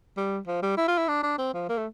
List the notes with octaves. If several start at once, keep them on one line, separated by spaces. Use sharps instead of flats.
G3
F3
G3
E4
F4
E4
D4
D4
C4
F3
A#3
A3